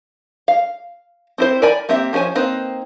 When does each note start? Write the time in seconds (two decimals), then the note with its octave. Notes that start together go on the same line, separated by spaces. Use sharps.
0.48 F5
1.38 C4 E4 C5
1.62 A#4 D5 G#5 B5
1.89 A#3 C4 G4 E5
2.13 F3 C#4 G#4 C5 G#5
2.35 A#3 C4 D#4 B4 C5